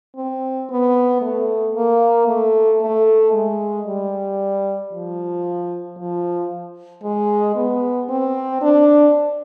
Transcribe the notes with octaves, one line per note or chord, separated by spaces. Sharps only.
C4
B3
A3
A#3
A3
A3
G#3
G3
F3
F3
G#3
B3
C4
D4